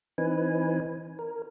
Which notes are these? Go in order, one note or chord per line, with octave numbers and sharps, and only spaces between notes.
E3 C4 D#4 B4 G#5
A#4